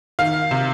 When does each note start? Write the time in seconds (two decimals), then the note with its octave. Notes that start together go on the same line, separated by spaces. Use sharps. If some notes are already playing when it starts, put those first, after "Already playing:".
0.19 D#3 F5
0.51 C3